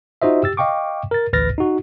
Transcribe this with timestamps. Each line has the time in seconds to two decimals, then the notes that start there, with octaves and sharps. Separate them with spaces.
0.22 D#4 F4 F#4 C5 D#5 E5
0.43 G4 E6 A6
0.57 D#5 F5 G5 C#6 D6
1.11 A#4 A6
1.33 A1 D2 B4 F6 A6 A#6
1.58 D#4 F#4